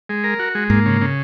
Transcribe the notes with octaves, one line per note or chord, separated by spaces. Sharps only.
G#3
A#4
F#4
G#3
G#2 A#3
C#3
C#3